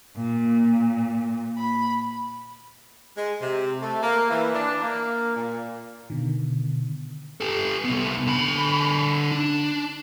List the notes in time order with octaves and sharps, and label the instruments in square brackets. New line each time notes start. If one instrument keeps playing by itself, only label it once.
[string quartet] A#2
B5
[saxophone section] G#3
C3
A3
A#3
E3
D4
A#3
A#2
[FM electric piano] B2 D3 D#3
[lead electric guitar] G4 A4
C2 B3
D3 B5
D4